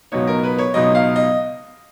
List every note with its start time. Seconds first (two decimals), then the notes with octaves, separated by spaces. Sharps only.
0.12 C#2 B2 F#3 B3 D#4 C#5
0.27 A#4
0.43 B4
0.58 C#5
0.74 C#2 B2 F#3 B3 D#4 D#5
0.95 F5
1.16 D#5